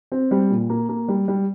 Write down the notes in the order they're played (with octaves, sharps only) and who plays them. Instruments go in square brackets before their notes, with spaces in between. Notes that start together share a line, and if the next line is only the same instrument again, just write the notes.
[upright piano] C4
G3
A#2
A#3
A#3
G3
G3